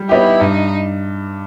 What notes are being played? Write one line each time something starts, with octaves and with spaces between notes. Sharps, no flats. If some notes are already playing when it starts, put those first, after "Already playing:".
Already playing: G3
B3 D#4 E4 G4
G2 D#4